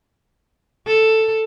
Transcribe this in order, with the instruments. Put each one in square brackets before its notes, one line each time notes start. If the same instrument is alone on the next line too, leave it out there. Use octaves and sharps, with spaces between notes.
[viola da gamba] A4